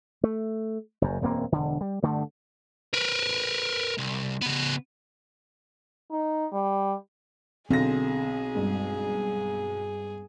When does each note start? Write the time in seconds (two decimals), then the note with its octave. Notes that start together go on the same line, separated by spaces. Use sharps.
0.24 A3
1.02 F#1 F#2
1.22 E1 F#2 A#3 C4
1.52 E1 D3
1.81 G3
2.03 G2 D3 A3
2.94 A#4 B4
3.98 C2
4.41 C#3 B3
6.11 D#4
6.53 G3
7.70 B1 D3 C4 G#4 A#6
8.55 G1 G#3